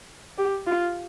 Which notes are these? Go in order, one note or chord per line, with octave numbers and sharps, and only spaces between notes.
G4
F4